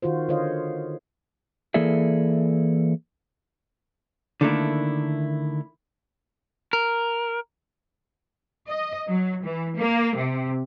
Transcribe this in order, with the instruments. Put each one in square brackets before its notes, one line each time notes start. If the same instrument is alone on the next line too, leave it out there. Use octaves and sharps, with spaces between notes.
[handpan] D#3 F4 F#4 C5
D3 F4 C5 C#5 D#5 F5
[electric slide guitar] E3 A#3 G#4 A4 D5 E5
[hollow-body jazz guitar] D3 D#3 A3 A#3 D4 E4
[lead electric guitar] A#4
[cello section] D#5
F#3
E3
A#3
C3